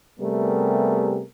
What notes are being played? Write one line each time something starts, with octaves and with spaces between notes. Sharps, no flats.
C3 G3 A3 B3 G#4 A#4